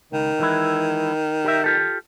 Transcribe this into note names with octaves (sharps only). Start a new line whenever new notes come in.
C#2 D#3
E3 G#3 E4
G4 A#4 E5
F4 G4 A4